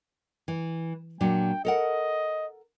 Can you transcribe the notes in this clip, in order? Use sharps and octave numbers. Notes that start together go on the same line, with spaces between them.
E3
A#2 F#3 D4 G5
A4 A#4 D#5 F#5